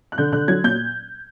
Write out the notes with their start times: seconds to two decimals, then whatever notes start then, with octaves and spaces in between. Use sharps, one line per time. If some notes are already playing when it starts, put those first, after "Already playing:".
0.12 F#6
0.18 D3 G6
0.32 D3 F#6
0.48 F#3 G#6
0.64 A#2 G6